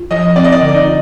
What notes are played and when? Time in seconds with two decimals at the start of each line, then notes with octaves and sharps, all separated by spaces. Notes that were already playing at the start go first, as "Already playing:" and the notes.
Already playing: F4
0.11 F3 D#5
0.36 C4 D5
0.44 D#5
0.52 D5
0.61 D3
0.74 D#4
0.87 F4